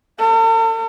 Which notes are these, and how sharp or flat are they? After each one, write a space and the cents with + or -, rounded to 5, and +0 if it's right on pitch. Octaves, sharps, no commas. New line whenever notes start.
A4 +45